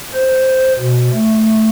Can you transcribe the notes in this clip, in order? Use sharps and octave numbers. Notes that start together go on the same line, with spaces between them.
C5
B2
A3